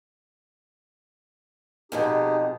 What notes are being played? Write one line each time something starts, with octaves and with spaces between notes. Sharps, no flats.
F2 G#2 B2 D#4 G4 G#4